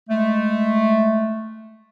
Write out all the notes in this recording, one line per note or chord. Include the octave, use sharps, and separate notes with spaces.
G#3 A3